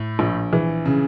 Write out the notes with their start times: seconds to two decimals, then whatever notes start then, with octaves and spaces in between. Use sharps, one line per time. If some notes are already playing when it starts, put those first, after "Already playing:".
Already playing: A2
0.19 A#1
0.53 E3
0.86 C#3